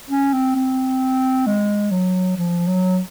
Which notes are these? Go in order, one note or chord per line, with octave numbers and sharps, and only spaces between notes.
C#4
C4
C4
G#3
F#3
F3
F#3